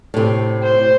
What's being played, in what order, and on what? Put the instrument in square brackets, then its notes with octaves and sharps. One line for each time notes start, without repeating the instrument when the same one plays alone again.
[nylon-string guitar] A2 C3
[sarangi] C5